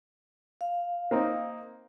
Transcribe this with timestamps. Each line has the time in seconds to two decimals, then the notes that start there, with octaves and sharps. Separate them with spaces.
0.61 F5
1.11 A#3 C4 D#4